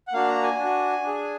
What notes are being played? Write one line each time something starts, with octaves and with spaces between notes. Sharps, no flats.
F#5
A#3 D4 F#4 F5
A#5
G#5
D4 F#4
D4 G#4